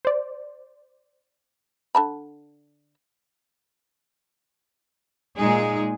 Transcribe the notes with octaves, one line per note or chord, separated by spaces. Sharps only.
C5 D5
D3 A5 B5
A#2 G#3 D#4 G#4